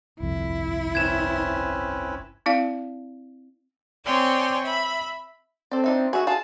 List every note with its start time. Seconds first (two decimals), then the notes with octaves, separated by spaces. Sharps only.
0.20 G1 C2 F2 E4
0.95 C4 C#4 B4 G#6 E7
2.46 C4 E4 D5 F5
4.05 C4 C#5 D5 G5 G#5 C6
4.64 E5 B5
5.71 C4 A4 D5
5.84 D4 D#4 E5
6.13 F#4 G#4 E5
6.27 F4 G#4 A5